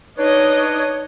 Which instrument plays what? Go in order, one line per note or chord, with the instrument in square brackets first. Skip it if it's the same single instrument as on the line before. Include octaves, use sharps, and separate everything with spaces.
[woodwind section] D4 B4 C#5 [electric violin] D#4 D#5